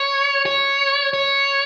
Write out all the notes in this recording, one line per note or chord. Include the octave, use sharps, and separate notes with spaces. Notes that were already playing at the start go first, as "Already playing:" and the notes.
Already playing: C#5
C#5
C#5